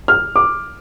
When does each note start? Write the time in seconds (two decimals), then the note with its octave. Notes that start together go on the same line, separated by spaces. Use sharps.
0.08 F6
0.36 D6